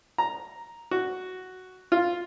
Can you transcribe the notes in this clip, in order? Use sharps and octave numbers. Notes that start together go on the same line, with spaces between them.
A#5
F#4
F4